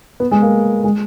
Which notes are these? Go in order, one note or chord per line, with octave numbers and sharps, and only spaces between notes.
B3
G#3
A#3
G#3